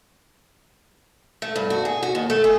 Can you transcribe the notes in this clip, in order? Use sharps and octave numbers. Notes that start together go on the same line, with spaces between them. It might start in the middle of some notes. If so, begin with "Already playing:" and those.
A3
G2
F#4
G#4
F#4
D#2
A3
G#4